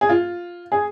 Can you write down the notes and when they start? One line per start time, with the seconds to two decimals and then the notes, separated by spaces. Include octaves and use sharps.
0.01 G#4
0.09 F4
0.72 G#4